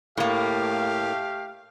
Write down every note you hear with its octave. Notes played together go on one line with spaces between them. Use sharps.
A2 A3 A#3 G4 F5